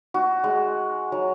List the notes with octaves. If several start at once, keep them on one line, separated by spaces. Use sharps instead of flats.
F#4
G#3
F#3